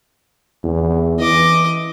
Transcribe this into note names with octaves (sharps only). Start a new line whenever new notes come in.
E2
E3 D#5 D6